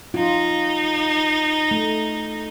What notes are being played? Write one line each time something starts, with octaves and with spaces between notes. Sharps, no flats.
D#4 F4
A3